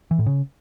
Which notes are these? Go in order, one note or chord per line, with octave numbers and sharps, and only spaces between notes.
E3
A2
C#3